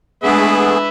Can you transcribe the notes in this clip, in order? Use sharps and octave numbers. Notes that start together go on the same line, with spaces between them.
G#3 A3 B3 D4 G#4 B4 E5